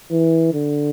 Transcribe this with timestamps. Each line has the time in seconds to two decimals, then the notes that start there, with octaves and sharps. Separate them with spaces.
0.11 E3
0.54 D3